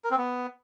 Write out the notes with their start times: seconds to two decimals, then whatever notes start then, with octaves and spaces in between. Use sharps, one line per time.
0.04 A#4
0.11 C4
0.18 B3